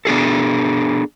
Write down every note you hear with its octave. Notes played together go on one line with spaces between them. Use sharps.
B3 D4 G#4 A4